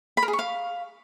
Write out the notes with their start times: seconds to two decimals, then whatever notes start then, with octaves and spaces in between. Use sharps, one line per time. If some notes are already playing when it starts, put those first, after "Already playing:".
0.17 B5
0.23 A#4
0.28 G#4
0.33 C#6
0.39 F5